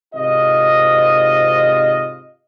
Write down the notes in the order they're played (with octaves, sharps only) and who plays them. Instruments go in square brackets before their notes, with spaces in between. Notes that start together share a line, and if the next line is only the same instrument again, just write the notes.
[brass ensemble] G#1 C3 F4 D#5